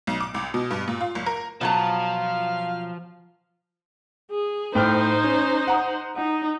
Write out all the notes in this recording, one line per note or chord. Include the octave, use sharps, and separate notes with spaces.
B1
D6
C2
B2
G2
A#2
F4
F#1
A#4
B2 F3 F#3 F5 A5
G#4
A2 D#4 C5 G5 F6
C#4
F#5 A#5 D#6
D#4 F#5